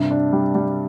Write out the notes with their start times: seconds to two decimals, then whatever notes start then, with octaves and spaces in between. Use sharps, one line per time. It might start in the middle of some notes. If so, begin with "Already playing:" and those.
Already playing: G2 C3
0.11 D4
0.33 G3
0.55 G3